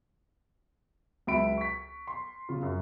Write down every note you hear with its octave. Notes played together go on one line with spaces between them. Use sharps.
C#2 F#3 E5 B5 D7
C#6 B6
C6
C#3 F4
F#2